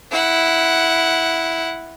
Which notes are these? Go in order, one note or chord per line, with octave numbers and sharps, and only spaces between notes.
E4 F#5